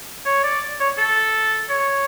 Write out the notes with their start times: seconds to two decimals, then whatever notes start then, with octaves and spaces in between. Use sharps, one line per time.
0.26 C#5
0.44 D5
0.80 C#5
0.98 A4
1.70 C#5